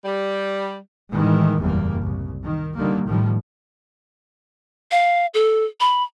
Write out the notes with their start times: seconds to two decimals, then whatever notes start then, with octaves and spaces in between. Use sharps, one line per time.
0.04 G3
1.12 A2 D#3 E3 G#3
1.60 F#1 E2 A2 G3 A#3
2.03 C2
2.44 D#3
2.75 D3 D#3 G3 A#3
3.06 A1 A2 D#3 F3 G3
4.91 F5
5.34 A4
5.80 B5